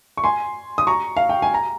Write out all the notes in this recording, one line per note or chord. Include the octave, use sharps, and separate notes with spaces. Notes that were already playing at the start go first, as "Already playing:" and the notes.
C#6
G#5 C6
D#6
A#5 C#6
F5
G5
G#5
A#5